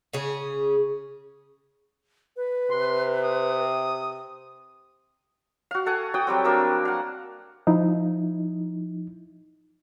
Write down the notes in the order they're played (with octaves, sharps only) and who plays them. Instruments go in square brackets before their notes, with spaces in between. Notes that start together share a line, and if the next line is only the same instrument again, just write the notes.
[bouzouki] C#3 C#4 G#4
[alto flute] B4
[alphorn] C3 [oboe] C6
[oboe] D#6
[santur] F#4 F5
A4 F#5 G#5
F#4 G5 D#6
F#3 G3 C4
A#3 D4 A#4 E6
F5 F#5
[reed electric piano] F3 D#4 E4